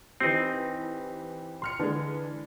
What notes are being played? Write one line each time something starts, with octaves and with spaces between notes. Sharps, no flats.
E3 C4 D#4 G4
C6 F6 C#7
D3 E3 G#3